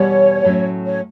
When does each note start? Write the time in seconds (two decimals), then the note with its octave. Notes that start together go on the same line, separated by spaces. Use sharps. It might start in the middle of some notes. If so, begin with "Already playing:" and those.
Already playing: E2 B2 G3 B3 C#5
0.45 A2 F#3 A3 C#4
0.87 C#5